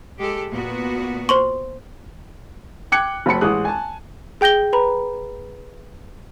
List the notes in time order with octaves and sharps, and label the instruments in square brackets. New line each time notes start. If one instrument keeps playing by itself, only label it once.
[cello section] G#3 G4 A4
A#2 B3 F#4
[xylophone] C5 C6 C#6
[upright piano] G5 D6 F#6 G#6 C#7
F#1 F#3 B5 C#7
A1 G#3 D#6 F#6
G#5 A5
[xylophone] G#4 G5 G6 A#6 G7
B4 A#5 B5